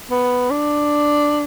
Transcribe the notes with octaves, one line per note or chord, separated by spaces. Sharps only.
B3
D4